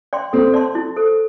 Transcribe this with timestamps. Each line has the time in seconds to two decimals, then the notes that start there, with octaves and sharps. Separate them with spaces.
0.13 D5 G5 C6
0.33 C4 A4
0.54 D5 A5 C6
0.75 E4
0.97 A4 C5